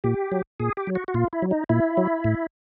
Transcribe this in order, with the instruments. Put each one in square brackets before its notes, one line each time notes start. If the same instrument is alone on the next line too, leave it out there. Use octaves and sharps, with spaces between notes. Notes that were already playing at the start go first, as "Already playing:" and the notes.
[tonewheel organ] A#2 G4
F#3
A#2 G#4
G4
F#3
F#4
F#4
A#2 F4
E4
F#3
D#4
A#2 E4
F#3
A2